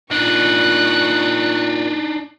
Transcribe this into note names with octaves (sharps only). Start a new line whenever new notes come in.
A#2 D4 D#4 C#6 F#6